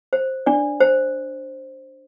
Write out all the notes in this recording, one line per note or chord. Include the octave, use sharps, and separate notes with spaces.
C5
D4 D5
C5